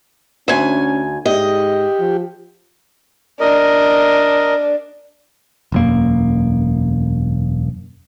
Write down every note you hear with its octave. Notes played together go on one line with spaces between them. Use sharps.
D2 C#4 G#5
G#2 G4 D#5
F3
D4 A#4 D#5
E1 F#2 A#3